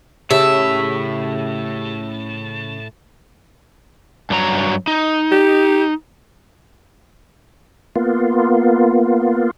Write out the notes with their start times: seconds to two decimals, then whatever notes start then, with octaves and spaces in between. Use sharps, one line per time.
0.30 A2 C#3 G4 E5 A5
4.30 G2 F#3 A#5
4.88 D#4
5.32 G4
7.96 A#3 B3 F4